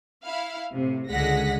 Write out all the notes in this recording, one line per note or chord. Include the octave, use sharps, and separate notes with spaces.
E4 F5
A2 C3
C#2 D3 G#3 F#5 A#6 B6